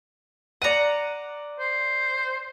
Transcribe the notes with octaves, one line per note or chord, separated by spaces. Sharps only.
D5 F#5 A#5 D#7
C5